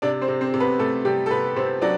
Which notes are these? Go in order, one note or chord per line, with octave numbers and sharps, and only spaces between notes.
C3 D4 D5
C4 C5
C3
C4 C5
C3
B3 B4
C3 A3 A4
C3 G3 G4
A4
C3 B3 B4
C3 C4 C5
F#3 D4 D5